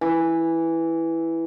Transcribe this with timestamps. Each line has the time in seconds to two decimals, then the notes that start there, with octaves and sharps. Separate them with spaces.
0.01 E3